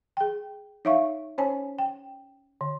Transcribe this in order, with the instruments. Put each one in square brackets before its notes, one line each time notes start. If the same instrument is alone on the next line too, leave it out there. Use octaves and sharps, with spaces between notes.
[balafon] G#4 G5
D#4 C#5 E5 F5 C#6
C#4 C5 C#5 G#5 A5
G5
D3